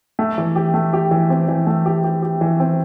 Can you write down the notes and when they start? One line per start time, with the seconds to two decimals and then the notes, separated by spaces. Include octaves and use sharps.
0.19 A3
0.38 E3
0.56 G4
0.74 A3
0.93 G4
1.11 E3
1.30 C4
1.48 E3
1.67 A3
1.86 G4
2.04 G4
2.22 G4
2.41 E3
2.60 C4